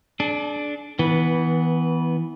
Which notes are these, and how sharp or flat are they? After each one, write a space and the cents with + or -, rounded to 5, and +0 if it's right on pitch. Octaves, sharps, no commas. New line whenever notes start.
D4 +0 G#4 +45
E3 -20 B3 +0